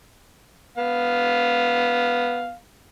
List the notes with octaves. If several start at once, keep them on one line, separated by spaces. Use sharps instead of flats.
B3 F5